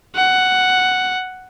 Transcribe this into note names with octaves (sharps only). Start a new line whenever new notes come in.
F#5